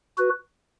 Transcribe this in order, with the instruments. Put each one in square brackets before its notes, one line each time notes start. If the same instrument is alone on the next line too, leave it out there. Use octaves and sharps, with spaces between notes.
[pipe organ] F#4 B4